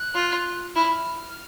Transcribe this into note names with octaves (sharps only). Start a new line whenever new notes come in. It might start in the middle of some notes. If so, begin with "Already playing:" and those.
Already playing: F#6
F4
E4 F6